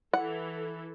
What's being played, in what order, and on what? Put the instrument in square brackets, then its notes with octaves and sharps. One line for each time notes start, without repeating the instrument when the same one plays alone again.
[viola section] E3 A4 [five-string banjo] F#5